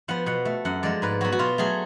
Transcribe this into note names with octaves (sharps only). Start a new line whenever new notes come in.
F3 B3 F#5
B2 F#5
A3
F#2 F#5
F3 G#3 D5
G#2 B4
F#3 B3 F#4
F#4
B2 F4
F#3 A3 G#4